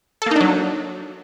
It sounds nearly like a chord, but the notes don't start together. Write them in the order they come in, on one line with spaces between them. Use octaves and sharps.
A4 A#3 D#4 D4 F#3